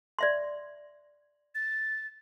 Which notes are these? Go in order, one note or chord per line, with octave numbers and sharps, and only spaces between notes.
D5 E5 C6
A6